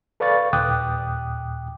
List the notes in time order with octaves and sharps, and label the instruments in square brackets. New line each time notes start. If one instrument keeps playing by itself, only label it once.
[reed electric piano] A4 B4 D5 F5 C#6 A6
D#2 A#2 G5 D6 D#6 F#6